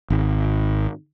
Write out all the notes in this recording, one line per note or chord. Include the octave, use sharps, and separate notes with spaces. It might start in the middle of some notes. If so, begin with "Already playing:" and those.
G#1